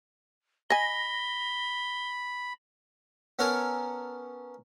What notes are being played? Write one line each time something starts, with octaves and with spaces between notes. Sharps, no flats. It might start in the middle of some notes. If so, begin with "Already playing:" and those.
D#5 G#5 B5 A#6 G7
B3 C#4 A4 A#4 C#5 G#5